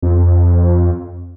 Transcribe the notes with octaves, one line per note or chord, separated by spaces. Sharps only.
F2